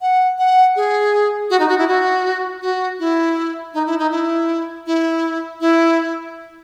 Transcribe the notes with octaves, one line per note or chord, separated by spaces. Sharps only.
F#5
F#5
G#4
F#4
D#4
F#4
E4
F#4
F#4
E4
D#4
E4
D#4
E4
E4
E4